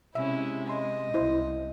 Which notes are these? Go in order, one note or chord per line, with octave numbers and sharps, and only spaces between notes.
C3 G#3 C#4 E4 E5
D#5 C6
C2 E4 C5